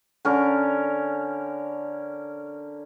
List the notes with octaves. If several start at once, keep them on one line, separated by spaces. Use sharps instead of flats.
D3 C#4 A#4